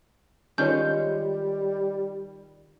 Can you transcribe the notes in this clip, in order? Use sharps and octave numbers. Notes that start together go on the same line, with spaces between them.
D#3 G3 G#3 C#4 F4 C#5 G6